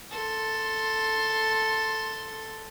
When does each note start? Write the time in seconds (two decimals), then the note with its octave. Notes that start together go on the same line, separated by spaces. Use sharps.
0.11 A4 C6